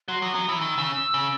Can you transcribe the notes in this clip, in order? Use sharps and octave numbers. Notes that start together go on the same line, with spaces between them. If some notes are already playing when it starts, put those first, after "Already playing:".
F#3 C6
F#3 D#6
F#3 D#6
E3 E6
D#3
C#3
C#3